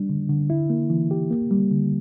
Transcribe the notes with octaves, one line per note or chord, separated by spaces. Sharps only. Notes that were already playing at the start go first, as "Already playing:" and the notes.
Already playing: G3 D4
D3
D3
E4
A#3
E3
G4
A#3
G3
D3